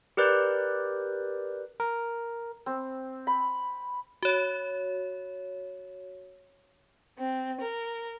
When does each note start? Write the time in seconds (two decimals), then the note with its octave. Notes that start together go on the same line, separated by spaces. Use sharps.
0.17 G4 A#4 B4 D5 F#6 G6
1.80 A#4
2.66 C4
3.27 B5
4.23 F#4 C#5
7.19 C4
7.60 A#4